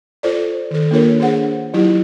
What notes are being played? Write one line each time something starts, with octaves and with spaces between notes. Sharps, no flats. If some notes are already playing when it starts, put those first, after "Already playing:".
F4 A4 C5 D5
D#3 A4
A#3 D4 F4 A#4 C#5
D4 G#4 C5 F#5
F#3 E4 F4 G4